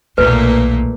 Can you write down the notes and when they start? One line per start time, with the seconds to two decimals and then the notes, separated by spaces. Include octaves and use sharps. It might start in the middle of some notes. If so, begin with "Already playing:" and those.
0.18 B1 E2 A#2 A3 A#3 B4